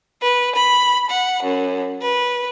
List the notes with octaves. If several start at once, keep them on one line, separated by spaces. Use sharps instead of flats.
B4
B5
F#5
F#2
B4